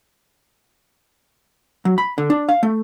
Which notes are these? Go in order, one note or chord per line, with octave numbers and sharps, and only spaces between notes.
F#3
B5
D3
D4
F5
A3